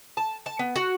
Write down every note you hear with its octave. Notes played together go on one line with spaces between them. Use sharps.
A5
A5
B3
F#4